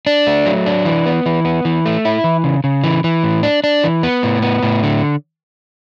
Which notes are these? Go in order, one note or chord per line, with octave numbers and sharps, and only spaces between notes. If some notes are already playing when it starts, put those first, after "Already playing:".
D4
A3
F#3
D4
E3
B3
E3
B3
E3
A3
E4
E3
C#3
C#3
E3
E3
A2
D4
D4
E3
B3
A2
B3
A2
D3